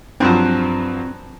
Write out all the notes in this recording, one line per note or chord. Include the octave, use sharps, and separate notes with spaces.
G2 F3 F#3 C4